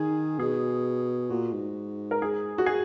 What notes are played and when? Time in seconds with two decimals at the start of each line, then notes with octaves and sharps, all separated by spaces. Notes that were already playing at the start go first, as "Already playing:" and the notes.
Already playing: D#3 G#4
0.39 B2 G#4
1.30 A#2 F#4
1.53 G#2
2.11 A#4
2.22 G#4
2.58 F#4
2.66 G#4